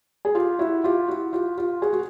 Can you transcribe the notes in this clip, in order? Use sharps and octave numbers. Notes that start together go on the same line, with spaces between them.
G#4
F4 G4
E4 F#4
F4 G4
E4 F#4
F4 G4
F4 G4
F#4 G#4
F#4